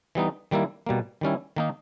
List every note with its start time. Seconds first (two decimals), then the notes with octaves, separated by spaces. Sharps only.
0.15 E3 G3 B3 D#4
0.51 D#3 G3 A#3 E4
0.86 B2 G3 A#3
1.21 D#3 G3 C#4 E4
1.56 D#3 A#3 D#4